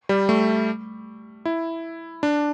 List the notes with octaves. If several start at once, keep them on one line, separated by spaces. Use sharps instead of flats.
G3
A3
E4
D4